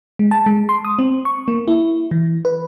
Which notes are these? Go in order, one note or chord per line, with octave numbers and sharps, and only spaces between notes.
G#3
A5
G#3
C6
D#6
C4
C#6
A#3
E4
E3
B4